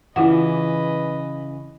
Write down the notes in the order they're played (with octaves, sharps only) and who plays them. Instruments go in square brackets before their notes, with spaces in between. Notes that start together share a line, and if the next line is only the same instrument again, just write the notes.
[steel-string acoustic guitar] C#3 E3 [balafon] E4 F4 F#5 [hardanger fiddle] B4 D#5